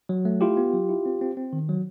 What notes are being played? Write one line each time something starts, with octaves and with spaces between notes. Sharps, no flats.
F#3
A3
E4 F4 G4
B3
F#3
E4
C4
C4
C4
D#3
F#3